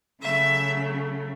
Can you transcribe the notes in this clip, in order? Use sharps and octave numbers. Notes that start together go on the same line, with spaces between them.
C#3 F#3 A3 E5